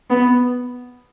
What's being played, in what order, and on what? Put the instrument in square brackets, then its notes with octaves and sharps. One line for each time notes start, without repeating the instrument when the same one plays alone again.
[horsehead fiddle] B3